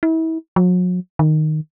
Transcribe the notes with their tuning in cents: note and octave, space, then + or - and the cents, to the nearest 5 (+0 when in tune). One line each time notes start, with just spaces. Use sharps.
E4 -35
F#3 -40
D#3 -10